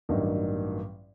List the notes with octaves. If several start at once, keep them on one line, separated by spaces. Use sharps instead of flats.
A1 G2 D#3 F#3